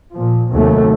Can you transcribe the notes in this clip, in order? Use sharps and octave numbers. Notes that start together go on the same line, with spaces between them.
A#2 F3
D#2 C3 F#3 A3